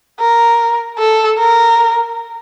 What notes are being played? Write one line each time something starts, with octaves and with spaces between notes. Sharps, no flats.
A#4
A4
A#4